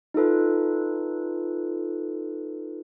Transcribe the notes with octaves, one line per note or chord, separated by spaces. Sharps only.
D#4 F4 A4 B4